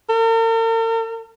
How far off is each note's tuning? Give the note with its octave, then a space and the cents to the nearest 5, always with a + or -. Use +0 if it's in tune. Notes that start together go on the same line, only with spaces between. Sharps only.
A#4 -45